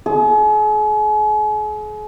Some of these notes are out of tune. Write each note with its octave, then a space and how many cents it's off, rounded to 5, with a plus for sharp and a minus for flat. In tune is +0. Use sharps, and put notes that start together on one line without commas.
G#4 +40 D#6 +0